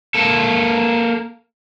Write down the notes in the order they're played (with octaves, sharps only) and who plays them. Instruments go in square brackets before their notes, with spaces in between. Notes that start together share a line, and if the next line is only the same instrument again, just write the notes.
[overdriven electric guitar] A#3 A4